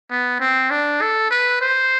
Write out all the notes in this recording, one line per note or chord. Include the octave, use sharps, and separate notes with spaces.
B3
C4
D4
A4
B4
C5